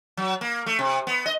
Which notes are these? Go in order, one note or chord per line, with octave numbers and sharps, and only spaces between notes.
F#3
A#3
A3
C3
B3
D#5